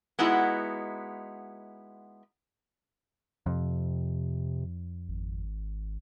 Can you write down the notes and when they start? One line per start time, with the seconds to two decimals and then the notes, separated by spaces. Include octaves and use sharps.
0.19 G#3 B3 D#4 E4 F#4
3.46 F2 C3
5.09 G#1